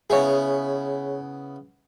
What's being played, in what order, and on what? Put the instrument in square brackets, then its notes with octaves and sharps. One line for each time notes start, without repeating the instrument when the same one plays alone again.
[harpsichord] C#3 B3 E4 [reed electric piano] G#4 C#5